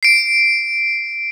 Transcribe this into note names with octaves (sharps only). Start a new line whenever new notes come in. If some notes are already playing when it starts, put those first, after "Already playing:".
C7 D7